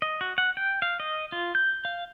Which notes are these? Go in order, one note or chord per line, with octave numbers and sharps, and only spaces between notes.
D#5
F#4
F#5
G5
F5
D#5
F4
G6
F5